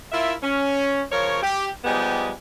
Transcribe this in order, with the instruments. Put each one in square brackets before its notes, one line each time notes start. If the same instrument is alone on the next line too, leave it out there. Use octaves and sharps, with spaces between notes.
[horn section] E4 F4 A#4 E5
C#4
C#3 F3 A#4 C#5
G4
F3 G3 G#3 B3 D#4 G4